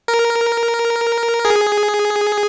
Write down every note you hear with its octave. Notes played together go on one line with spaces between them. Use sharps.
A#4
G#4